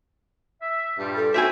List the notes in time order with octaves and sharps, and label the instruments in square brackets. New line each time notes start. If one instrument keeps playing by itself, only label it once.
[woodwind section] E5
[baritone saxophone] G2 [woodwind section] A#2 G3
[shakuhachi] A4
[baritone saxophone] C4 [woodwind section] D#4 E4 [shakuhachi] F#4 [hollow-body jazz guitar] E5 G5 G#5